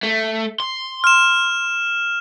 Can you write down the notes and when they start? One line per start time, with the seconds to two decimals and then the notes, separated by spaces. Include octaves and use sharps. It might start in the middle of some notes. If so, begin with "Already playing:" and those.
0.03 A3
0.60 C6
1.04 F6 E7